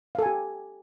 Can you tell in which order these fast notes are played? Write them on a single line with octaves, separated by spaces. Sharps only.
F5 A4 G#5 G4